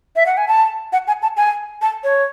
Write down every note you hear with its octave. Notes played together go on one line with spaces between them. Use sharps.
E5
F#5
G#5
A5
F#5
G#5
A5
G#5
A5
C#5